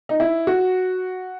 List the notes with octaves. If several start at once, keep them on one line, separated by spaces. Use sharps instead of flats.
D#4
E4
F#4